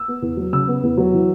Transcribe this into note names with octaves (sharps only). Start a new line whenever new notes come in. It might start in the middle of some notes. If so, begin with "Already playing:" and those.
Already playing: E6
B3
E2
F#3
C#3 E6
B3
E2
F#3
E3